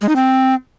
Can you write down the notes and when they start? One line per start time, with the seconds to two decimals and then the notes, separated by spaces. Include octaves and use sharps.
0.02 G#3
0.09 D#4
0.16 C4